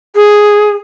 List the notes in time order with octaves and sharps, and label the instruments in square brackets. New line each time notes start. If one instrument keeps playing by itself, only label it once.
[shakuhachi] G#4